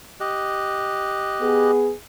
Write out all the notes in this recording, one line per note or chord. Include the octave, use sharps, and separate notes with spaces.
G4 D#5 F#6
B3 G#4